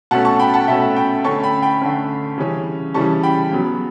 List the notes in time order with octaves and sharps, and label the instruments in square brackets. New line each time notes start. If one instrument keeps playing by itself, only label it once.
[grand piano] B2 A3 C#4 F#5 A5
A5 C#6
G5 B5
F#5 A5
B2 A3 C#4 E5 G5
G5 B5
D3 A3 C#4 A5 C#6
G5 B5
G5 B5
D3 A3 C#4
C#3 E3 G3 C#4
C#3 E3 G3 C#4 A5 C#6
G5 B5
C#3 F#3 B3